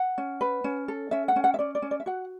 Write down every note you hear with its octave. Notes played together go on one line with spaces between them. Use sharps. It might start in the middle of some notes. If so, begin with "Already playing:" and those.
Already playing: F#5
C#4
B4
C#4
A4
C#4 E5
F#5
C#4
F#5
E5
C#4 D5
D5
C#4
D5
E5
F#4 F#5